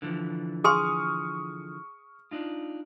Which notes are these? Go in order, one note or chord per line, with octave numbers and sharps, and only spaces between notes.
D3 E3 F3
G#4 G#5 C6 C#6 D#6 F6
D4 D#4 F4